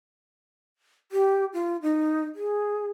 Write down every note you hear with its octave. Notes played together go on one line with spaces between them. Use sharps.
G4
F4
D#4
G#4